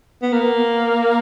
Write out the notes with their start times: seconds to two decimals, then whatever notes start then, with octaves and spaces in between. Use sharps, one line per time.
0.23 B3
0.32 A#3